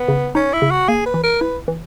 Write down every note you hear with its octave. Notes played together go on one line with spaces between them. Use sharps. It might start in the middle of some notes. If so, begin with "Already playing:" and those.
Already playing: B3
C#3
C#4 D#4
E4
C#3
F#4
A#3 G#4
B4
E3
A#4
E4 B4
E3